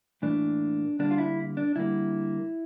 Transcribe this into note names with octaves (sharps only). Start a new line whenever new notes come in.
A2 E3 A#3 D4
D3 G3 A#3 D4
F4
E4
D4
D3 G3 A#3 E4